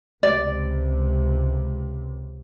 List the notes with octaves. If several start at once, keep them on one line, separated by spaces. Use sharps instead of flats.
C#2 C3 D5